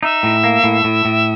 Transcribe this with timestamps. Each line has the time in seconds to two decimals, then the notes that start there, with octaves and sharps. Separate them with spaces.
0.03 D#4 E5
0.23 A2
0.44 A#3
0.64 A2
0.84 A2
1.05 A2